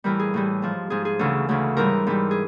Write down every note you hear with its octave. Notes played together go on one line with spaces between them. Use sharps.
A2 E3 G3 A#4
G#4
A2 E3 G3
G#2 F3
G#2 F3 G#4
G#4
D2 C#3 E3 A4
D2 C#3 E3
G#2 E3 G3 A#4
G#2 E3 G3
G#4